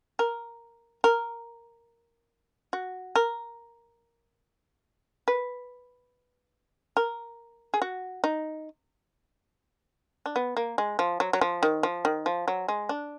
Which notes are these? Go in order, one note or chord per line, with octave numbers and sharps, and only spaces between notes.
A#4
A#4
F#4
A#4
B4
A#4
G#4
F#4
D#4
D4
B3
A#3
G#3
F3
F#3
F#3
F3
D#3
F3
D#3
F3
F#3
G#3
D4